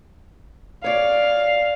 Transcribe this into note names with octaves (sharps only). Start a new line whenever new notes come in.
C#5 D5 F5